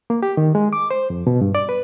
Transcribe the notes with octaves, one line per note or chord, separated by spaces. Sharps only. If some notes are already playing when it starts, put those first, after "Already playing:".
A#3
G4
D#3
G#3
D6
C5
F2
B2
G2
D5
B4